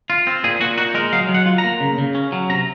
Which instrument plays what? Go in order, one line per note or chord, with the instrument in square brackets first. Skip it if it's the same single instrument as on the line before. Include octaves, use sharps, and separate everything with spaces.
[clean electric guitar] F4
C4
A#2 G#4
A#2 F#4
D#4 F#4
G#3 A#4
F#3 F5
F#3
F#5
F4
A#5
A#3
C#3
C#3
C#4
F#3
C3 A#5